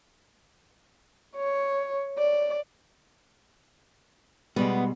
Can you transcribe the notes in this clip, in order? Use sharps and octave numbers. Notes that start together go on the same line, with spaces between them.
C#5
D5
B2 G3 G#3 B3